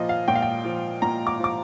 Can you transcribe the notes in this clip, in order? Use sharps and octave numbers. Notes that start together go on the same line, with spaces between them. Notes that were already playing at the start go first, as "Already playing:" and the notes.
Already playing: A#2 F3 D#5
F5
A#2 G5
F5
G5
F3
A#2 A#5
D6
F3 D6